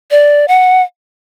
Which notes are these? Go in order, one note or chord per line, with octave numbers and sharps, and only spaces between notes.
D5
F#5